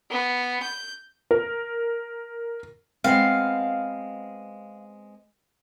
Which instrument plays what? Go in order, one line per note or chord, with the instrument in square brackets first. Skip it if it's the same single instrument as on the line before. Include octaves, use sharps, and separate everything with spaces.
[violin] B3
G6
[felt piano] A#4
[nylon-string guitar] G#3 B3 C4 [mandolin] F5